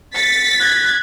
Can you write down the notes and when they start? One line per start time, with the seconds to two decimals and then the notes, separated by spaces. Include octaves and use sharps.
0.15 A6 B6 C#7
0.59 F#6 G#6